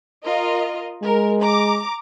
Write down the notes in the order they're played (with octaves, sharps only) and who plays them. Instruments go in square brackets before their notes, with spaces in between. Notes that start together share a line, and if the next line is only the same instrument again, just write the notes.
[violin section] F4 A#4 D#5
[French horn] G#3 [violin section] A#4
[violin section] A#5 D6